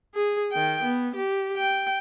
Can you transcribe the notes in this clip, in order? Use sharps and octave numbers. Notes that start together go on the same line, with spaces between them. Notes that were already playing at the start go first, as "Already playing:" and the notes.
G#4
D#3 G5
B3
G4
G5